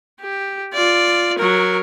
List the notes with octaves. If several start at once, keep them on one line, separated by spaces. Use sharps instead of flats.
G4
F4 D5
F#3 A#4